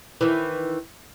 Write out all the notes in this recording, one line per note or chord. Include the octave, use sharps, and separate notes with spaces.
D#3 E3